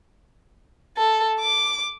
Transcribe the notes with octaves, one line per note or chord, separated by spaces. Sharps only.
A4
D6